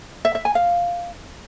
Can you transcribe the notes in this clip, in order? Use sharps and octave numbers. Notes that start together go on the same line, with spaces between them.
E5
E5
G#5
F5